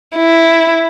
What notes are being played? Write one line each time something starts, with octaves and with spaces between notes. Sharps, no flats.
E4